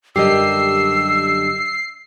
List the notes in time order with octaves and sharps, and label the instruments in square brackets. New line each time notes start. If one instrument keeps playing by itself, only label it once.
[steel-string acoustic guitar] F#2 D3 G3 [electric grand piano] G4 D#5 [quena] E6 [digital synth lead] C7